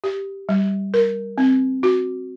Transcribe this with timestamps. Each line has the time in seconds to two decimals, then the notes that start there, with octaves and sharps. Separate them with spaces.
0.04 G4
0.49 G3
0.94 A#4
1.38 C4
1.83 F#4